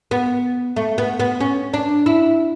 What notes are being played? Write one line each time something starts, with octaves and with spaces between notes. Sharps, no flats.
B3
A3
B3
B3
C#4
D4
E4